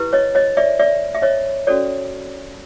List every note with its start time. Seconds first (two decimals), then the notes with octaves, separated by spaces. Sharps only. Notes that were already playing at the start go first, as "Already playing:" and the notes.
Already playing: E4 G4 B4
0.13 C#5 D#5
0.35 C#5 D#5
0.57 D5 E5
0.79 D5 E5
1.15 E5
1.22 C#5 D#5
1.67 C#4 F#4 A4 C#5 D5